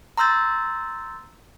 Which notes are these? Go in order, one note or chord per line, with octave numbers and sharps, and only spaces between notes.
A#5 C6 E6 G6 A6